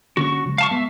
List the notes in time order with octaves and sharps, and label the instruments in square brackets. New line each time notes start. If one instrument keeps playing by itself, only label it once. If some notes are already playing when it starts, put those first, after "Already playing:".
[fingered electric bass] D3 A#3 C#4 [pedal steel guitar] F#4 C#6
[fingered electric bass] C#3 F#3 G#3
[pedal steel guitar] F5 A5 C#6
[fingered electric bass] F#3 G#3 B3 [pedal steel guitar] E5